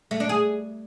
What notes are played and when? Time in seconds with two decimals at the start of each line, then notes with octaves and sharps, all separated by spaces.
0.11 A3
0.20 D4
0.29 G#4